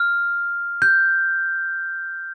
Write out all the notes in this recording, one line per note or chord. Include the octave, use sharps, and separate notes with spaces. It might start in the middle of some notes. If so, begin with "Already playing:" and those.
Already playing: F6
G6